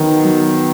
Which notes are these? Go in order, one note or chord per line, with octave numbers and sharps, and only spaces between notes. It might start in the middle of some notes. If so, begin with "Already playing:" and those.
Already playing: D#3 F#3 B3
F#3